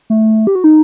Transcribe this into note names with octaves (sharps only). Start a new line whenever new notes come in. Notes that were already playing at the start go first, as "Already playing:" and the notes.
A3
G4
F#4
D#4